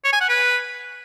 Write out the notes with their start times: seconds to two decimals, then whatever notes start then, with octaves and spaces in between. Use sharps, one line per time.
0.04 C#5
0.12 G#5
0.20 F#5
0.29 B4